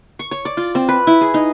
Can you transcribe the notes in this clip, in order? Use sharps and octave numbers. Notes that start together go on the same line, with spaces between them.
C#6
C#5
D5
F4
C4
B4
E4
G#4
D#4